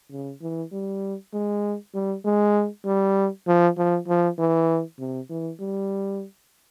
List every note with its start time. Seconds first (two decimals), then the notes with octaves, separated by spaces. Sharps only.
0.11 C#3
0.41 E3
0.72 G3
1.33 G#3
1.94 G3
2.24 G#3
2.85 G3
3.47 F3
3.77 F3
4.07 F3
4.38 E3
4.99 C3
5.30 E3
5.60 G3